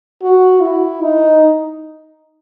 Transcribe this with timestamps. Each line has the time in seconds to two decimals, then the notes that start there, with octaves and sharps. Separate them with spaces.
0.23 F#4
0.61 E4
1.01 D#4